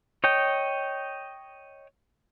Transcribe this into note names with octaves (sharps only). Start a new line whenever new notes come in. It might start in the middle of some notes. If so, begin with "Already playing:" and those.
C#5 D#5 G5